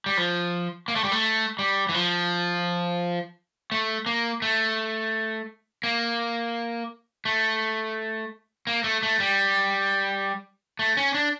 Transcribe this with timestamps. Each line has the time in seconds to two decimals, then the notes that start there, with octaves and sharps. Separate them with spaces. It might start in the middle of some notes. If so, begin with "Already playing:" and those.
0.06 G3
0.17 F3
0.88 A#3
0.96 A3
1.04 G3
1.12 A3
1.59 G3
1.89 E3
1.94 F3
3.72 A3
4.06 A#3
4.42 A3
5.83 A#3
7.25 A3
8.67 A#3
8.84 A3
9.03 A3
9.20 G3
10.79 A3
10.97 C#4
11.14 D4